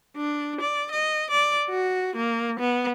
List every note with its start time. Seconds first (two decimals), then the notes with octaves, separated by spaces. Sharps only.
0.17 D4
0.61 D5
0.92 D#5
1.31 D5
1.70 F#4
2.16 A#3
2.60 B3